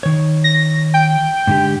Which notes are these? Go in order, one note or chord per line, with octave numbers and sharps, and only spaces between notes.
D#3 C#5
A#6
G5
G#2 D3 G4